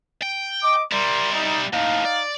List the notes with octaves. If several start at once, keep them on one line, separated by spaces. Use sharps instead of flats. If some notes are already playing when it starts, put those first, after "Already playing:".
G5
D#5 D6
G3 E4 A#4 D5 C6
D#4
D#2 A2 D#4 F5
D5